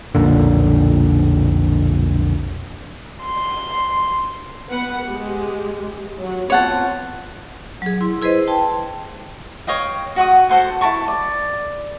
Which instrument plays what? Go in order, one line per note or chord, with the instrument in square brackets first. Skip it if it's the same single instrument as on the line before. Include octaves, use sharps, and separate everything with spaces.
[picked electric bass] B1 F2 A#2 D3
[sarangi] C6
[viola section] B3 B4 F#5
G#3 G4
F#3 F#4
[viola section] B3 C4 F4 [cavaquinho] C#5 F#5 A5
[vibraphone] F#3 G#4
E4 C6
E4 G#4 B4 C5 D#5
G5 A5 C6
[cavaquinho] C#5 D#5 F5 G5
F#4 F#5 C#6 D#6
F#4 A4 C5 F#5
E4 A#4 A5 C#6
D5